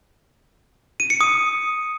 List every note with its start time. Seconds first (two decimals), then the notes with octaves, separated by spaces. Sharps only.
1.00 D#7
1.10 C#7
1.21 D#6